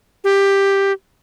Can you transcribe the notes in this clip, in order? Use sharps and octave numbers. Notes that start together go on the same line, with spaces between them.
G4